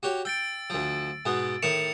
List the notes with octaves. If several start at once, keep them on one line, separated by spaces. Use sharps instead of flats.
F#4 G4 C#5
G5 E6 A6 D7
D2 F3
G#2 B2 B3
A2 D#3 C#6 C#7 E7 F7